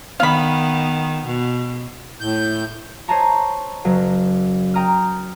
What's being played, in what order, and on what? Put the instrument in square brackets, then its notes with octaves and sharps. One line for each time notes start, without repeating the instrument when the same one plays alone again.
[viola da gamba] D#3 B3 [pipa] F5 B5
[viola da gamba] B2
[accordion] A2 G6
[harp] C5 C#5 D#5 A5 A#5 C#6
F#1 F#3
G5 A#5 D#6 F6